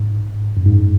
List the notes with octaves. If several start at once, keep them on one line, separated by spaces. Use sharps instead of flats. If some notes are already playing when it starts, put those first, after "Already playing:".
Already playing: G#2
F#2
G#2